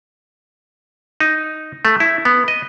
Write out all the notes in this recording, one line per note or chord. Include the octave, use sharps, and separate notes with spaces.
D#4
A3
E4
B3
D#5